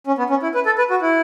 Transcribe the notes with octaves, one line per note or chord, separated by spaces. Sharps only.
C#4
B3
C#4
E4
B4
A4
B4
F#4
E4